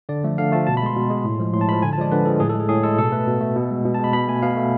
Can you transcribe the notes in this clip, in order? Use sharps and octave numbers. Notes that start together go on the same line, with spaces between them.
D3 D5
F3 A3
D3 F5
F3 A3 A5
B2 A5
B5
G#3 C6
B2
G#3
A2
F3 G#3
A2 C6
A5
F3 G#3 B5
D3 G#5
A5
F3 G#3 D5
D3 B4
F3 G#3 A4
A2 G#4
A4
G#3 G#4
A2 G#4
G#3 A4
B2 A4
A3 B4
B2
A3
B2
G#3
B2
A5
G#3 B5
B2 B5
A3 G#5
B2 F5
A3